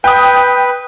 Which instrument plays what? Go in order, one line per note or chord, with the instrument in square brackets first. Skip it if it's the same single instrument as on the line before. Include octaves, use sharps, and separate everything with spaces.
[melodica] B4 [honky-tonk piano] G5 D#6